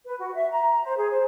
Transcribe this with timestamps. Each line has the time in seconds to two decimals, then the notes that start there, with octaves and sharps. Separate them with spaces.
0.06 B4
0.19 F#4
0.35 E5
0.52 A#5
0.84 C5
0.97 G#4
1.11 C5